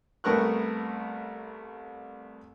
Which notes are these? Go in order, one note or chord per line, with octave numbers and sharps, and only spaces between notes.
C2 A3 B3 A#4 C#6 F#6